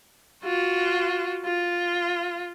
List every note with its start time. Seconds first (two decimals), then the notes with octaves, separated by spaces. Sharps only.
0.44 F4 F#4
1.45 F4